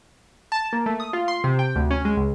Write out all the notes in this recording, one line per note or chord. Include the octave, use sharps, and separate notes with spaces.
A5
A#3
A3
D#6
F4
C6
C3
G5
D2
C#4
G#3
C#2